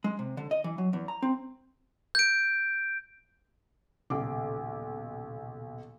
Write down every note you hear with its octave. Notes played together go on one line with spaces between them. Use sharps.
G#3
C3
D3
D#5
E3
F#3
E2
A#5
C4
G6 D7
D#1 B1 C#3 D6